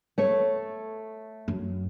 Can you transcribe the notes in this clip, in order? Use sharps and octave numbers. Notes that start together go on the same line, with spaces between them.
A3 C#5
F#2